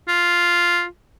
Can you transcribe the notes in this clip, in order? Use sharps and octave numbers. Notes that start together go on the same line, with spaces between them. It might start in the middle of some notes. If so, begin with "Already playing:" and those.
F4